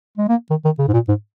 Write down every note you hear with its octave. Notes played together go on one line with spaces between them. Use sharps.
G#3
A#3
D#3
D#3
C#3
G#2
A#2
G#2